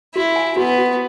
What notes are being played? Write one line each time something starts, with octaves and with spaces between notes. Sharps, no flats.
E4 F#4
G#5
B3 F#4
F#4